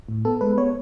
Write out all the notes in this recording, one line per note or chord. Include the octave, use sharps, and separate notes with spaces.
A2
B3 A4
G#3 B4
B3 C#5